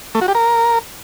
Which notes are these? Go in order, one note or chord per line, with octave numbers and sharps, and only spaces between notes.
A3
F#4
G4
A#4